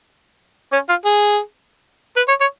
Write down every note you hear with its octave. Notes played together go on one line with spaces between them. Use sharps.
C#4
F4
G#4
B4
C#5
C#5